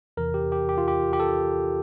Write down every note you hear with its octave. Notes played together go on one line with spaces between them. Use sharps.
E2 C3 E3 A#4
G4
G4
G4
F4
G4
G4
A4